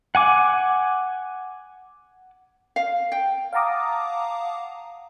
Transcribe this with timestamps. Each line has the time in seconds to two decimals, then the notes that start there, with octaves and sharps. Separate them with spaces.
0.15 F#5 G#5 D6
2.76 F5
3.12 G5
3.53 F5 F#5 A5 A#5 D6 D#6